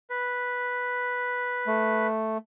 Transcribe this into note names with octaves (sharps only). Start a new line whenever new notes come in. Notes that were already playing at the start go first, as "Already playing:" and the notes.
B4
A3